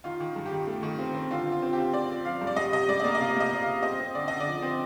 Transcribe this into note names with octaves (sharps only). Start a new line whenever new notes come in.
D#3 F4
D#3
G2
G4
D#3
A3
D#3
C4
C4
D3 F4
C4
F4
C4
G4
C4
C4 D5
C4
F3 F5
G2
D5
G3 D#5
C3 D#5
G3 D5
D#5
A#3 D5
D#5
C3 F5
A#3 D#5
C3
F5
C3
C4 D#5
C4
D3 D5
D3 D#5
D5
F3
C4